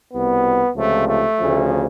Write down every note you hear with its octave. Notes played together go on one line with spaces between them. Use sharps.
C2 B2 B3
C#2 C3 F3 A3
A3
D2 C#3 F3